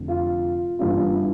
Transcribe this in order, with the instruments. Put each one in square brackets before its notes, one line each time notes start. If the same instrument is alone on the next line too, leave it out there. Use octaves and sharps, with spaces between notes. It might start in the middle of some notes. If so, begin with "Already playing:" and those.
Already playing: [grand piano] F1 F2 D3
F4
G1 G2 E3 G3 D4 F4
E4